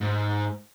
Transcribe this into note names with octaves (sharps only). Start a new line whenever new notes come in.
G#2